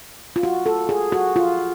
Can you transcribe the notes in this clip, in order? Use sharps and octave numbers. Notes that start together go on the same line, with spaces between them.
F4
F#4
A4
G#4
F#4
F4